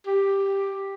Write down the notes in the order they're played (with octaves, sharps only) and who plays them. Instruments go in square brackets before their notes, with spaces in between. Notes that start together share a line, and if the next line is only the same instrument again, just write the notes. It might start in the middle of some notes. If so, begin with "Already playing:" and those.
[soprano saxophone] G4